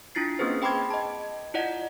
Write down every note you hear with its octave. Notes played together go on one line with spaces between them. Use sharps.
D4 E4 F4 A6 C7
A#3 C4 C#4 G#4 B4 C5
G#4 G5 B5 C6 D6 G#6
D#5 A5
E4 F4 D5 D#5 F#5